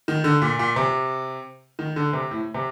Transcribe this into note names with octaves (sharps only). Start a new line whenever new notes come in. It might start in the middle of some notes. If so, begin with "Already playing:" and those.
D#3
D3
A#2
A#2
C3
D#3
D3
C3
A2
C3